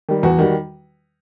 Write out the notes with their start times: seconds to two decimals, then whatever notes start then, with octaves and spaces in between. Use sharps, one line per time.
0.09 D#3 G3
0.23 E2 F#4
0.39 D#3 G3